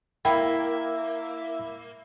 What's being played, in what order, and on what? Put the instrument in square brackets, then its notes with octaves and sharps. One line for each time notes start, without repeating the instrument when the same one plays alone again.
[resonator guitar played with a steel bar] A#3 [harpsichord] E4 [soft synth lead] E5 [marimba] G5